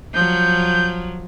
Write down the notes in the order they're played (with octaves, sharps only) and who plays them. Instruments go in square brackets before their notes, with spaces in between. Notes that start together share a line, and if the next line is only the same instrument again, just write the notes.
[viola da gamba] F3 F#3 [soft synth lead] G6